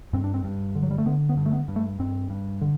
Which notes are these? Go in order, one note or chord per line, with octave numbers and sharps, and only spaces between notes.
G2 C4
D4
C4
G2
D3
F#3
G3
A3
D3 B3
B3
G2
A3
B3
G2
A3
G2 C4
G2
D3